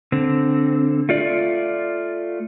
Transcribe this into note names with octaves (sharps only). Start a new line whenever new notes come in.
D3 C4
A3 F4 D5